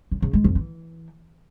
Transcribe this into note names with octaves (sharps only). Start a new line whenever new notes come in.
C#3
C#3
G#3
F2
E3